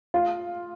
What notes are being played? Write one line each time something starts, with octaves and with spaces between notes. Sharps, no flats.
F4